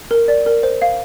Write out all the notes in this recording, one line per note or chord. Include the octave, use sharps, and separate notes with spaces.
A#4
D5
A#4
C5
F5